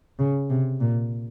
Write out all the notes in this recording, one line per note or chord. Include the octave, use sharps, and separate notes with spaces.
C#3
C3
A#2